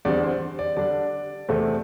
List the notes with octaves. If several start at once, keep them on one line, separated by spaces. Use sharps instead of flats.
E2 D3 G3 C4 D5
C5
D5
D3 G3 D4 D5
E2 C3 A3 C4